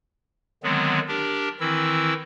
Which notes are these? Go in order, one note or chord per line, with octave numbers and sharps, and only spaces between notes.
D3 D#3 F#3 G#3 B3 C4
D4 G4 A#4
D#3 E3 C4 E4 E6